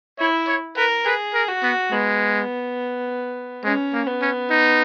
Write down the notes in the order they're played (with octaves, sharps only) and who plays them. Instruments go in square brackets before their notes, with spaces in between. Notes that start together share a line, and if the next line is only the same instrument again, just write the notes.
[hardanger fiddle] E4 [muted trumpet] C#5
[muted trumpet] C#5
[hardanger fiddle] A#4 [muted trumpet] B4
[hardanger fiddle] G#4 [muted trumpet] B4
[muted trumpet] A#4
[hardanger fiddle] F#4
[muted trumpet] B3
[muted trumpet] G#3 [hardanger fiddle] B3
[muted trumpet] G#3 [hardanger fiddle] C#4
[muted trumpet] A#3
[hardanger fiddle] B3
[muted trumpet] C#4
D#4